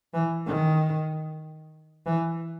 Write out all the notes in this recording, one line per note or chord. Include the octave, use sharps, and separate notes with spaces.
E3
D#3
E3